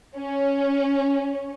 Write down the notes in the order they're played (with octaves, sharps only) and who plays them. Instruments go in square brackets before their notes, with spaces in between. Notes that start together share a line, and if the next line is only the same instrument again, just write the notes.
[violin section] C#4